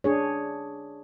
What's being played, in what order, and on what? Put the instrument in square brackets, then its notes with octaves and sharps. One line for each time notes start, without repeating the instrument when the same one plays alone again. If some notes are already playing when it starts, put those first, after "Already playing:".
[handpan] D4 G#4 C#5